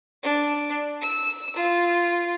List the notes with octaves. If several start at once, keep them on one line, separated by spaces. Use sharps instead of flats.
D4
E6
F4